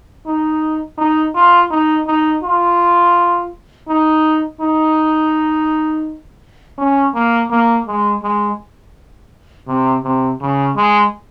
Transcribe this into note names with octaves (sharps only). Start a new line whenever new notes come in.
D#4
D#4
F4
D#4
D#4
F4
D#4
D#4
C#4
A#3
A#3
G#3
G#3
C3
C3
C#3
G#3